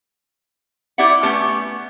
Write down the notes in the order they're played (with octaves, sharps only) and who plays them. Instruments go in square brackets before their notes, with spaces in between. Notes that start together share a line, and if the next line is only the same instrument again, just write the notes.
[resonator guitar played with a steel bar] E4 G4 D5 E5 F#5
A3 B3 C#4 G4